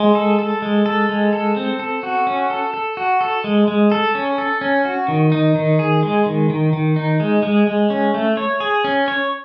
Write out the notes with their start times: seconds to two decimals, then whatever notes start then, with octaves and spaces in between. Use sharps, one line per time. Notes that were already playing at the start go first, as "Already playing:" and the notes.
Already playing: G#3
0.15 A4
0.39 A4
0.62 G#3
0.86 A4
1.09 G#3
1.33 A4
1.56 C4
1.79 A4
2.03 F#4
2.27 C#4
2.50 A4
2.74 A4
2.97 F#4
3.21 A4
3.44 G#3
3.68 G#3
3.92 A4
4.15 C#4
4.38 A4
4.61 C#4
4.85 F#4
5.08 D#3
5.32 D#4
5.55 D#3
5.79 G#4
6.03 G#3
6.26 D#3
6.50 D#3
6.73 D#3
6.96 D#4
7.20 G#3
7.43 G#3
7.67 G#3
7.90 C#4
8.14 A3
8.37 C#5
8.60 G#4
8.84 C#4
9.08 C#5